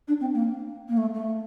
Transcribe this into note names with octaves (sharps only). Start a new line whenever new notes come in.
D4
C4
A#3
A#3
A3
A3